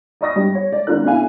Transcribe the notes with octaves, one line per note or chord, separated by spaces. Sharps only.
D5 D#5 B5 C#6 D#6 A#6
G2 G3
C#5
D5
G#1 D4 F4 A#4 F#6
B1 C#4 D4 E4 F5 G#5